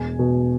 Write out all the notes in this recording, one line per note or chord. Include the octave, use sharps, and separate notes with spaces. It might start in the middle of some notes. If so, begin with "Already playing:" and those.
Already playing: E1 G#5
B2